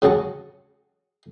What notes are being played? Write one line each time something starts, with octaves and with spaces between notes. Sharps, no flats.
C#3 F#3 G#4 A5 C#6